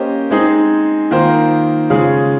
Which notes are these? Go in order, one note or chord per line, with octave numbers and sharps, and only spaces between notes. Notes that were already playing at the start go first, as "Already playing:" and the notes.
Already playing: A#3 C#4 G4 C5 D#5
G#3 C4 D#4 G#4
D#3 A#3 F4 C5
C#3 G#3 C#4 F4 G#4